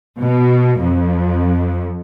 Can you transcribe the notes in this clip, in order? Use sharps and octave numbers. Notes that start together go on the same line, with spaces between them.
B2
F2